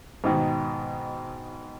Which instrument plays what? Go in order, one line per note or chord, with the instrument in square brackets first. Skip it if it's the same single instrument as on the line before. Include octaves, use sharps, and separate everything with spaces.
[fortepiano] G#2 B2 D#3